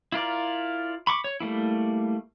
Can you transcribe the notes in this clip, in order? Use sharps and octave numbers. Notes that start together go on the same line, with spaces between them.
E4 F4 A#4 D5
B5 C#6 D6
C#5
G3 A3 A#3 E4